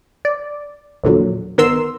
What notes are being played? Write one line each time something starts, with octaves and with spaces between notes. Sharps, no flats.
D5
A#1 E2 A#2 D3 F#3
G1 D#3 B3 A#4 C6 E6